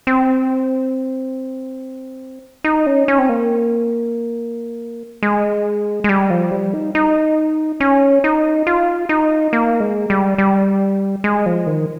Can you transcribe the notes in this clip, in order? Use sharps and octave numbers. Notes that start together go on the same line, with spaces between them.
C4
D#4
C#4
C#4
C4
A#3
G#3
G#3
G3
F3
G3
D#4
D#4
C#4
D#4
F4
D#4
A#3
G#3
G3
G3
G#3
F3
D#3